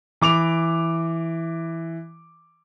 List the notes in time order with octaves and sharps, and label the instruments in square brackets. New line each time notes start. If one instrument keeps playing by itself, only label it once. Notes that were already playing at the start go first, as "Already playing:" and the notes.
[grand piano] E3 D6 F7